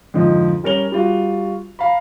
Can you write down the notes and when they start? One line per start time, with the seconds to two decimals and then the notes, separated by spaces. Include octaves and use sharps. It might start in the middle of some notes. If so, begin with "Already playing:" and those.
0.14 F2 G#2 D3 F3 D#4
0.64 G3 C#4 A#4 C#5 F7 G7
0.92 G3 F4 F#4
1.79 F5 A#5 B5